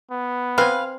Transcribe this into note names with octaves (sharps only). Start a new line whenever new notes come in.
B3
C4 B4 F5 G#5